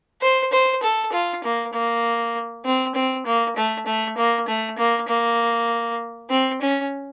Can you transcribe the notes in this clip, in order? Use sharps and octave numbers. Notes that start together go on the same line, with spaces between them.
C5
C5
A4
F4
A#3
A#3
C4
C4
A#3
A3
A3
A#3
A3
A#3
A#3
C4
C#4